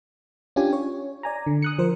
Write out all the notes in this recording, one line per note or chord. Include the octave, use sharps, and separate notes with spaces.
C#4 D4 F4 G4 G#5
C#5
D5 G#5 A#5
D3
D#6 F#6 C#7
F3 A#4 C5